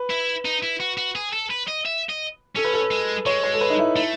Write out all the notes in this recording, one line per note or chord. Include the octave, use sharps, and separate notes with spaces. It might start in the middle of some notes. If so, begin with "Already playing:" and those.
Already playing: B4
E4
D#4
E4
F#4
F#4
G#4
A4
B4
D#5
E5
D#5
C#4 A4
B4
A4
G#3
G#3 C#5
C#5
A4
B4
D#4
E4
A3 E4